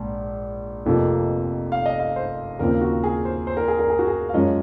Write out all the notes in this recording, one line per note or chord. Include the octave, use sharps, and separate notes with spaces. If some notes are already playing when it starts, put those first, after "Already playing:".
Already playing: A#1 G#2
F1 F2 C3 F3 A#3
F5
D#5
F5
C5
D#2 C#3 F3 C4 A#4
F#4
G#4
C5
C5
A#4
G#4
A#4
G#4
F#4
G#4
F5
F#2 F3 G#3 C#4 D#5